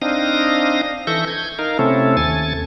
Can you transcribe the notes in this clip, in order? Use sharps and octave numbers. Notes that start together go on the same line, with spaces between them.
C4 D4 D#4 F5 D#6 A#6
E3 A4 E5 C#6 G6 A#6
G6 G#6
D#4 A#4 F5
C3 A3 C4 C#4 E4 A4
D#2 A4 G#5 A6